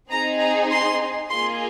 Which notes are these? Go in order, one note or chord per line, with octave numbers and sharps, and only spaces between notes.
C4 D#4 G#4 A#5
A#5
C6
A#3 F4 G#4 C6